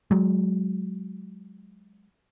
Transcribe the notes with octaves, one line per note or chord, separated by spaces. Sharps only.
F#3 G#3